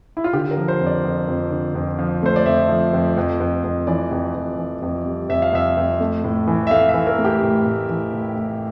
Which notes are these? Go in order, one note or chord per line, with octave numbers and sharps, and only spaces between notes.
E4
F4
D3 G4
A#4
F3
C5
F2
D5
F2
F2
D3
F2
F3
A3 C5
D5
F2 E5
F3
F2
F2
F2
F2
E3 D5
F2
F2
E3
F2
G3
F2 E5
F5
F2 E5
F2
A3
A2
E3
E5
A3 F5
E5
E3
A#4
A3
G4
A2
A2
E3
A2
A2